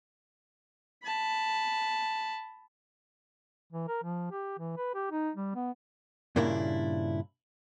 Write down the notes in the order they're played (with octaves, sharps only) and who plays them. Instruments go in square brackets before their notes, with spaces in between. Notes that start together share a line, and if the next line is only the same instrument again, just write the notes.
[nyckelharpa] A5 B5
[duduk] E3
A#4
F3
G4
E3
B4
G4
D#4
G3
B3
[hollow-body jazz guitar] G2 A#2 C#3 A#3 D4 E4